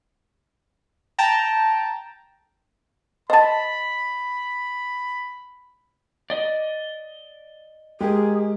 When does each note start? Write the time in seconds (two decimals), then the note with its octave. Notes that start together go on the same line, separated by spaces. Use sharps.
1.19 G5 A5 A#5
3.30 C5 D#5 A5 B5 A6
6.30 D5 D#5
8.01 G#3 G4 G#4 A#4